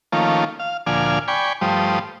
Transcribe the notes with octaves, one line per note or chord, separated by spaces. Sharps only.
D#3 F3 A3 A#3 C#4 F4
F5
D2 A#2 F3 D5 G#5 F6
D5 G5 G#5 B5 C#6
G2 F3 G3 A3 C5 D#6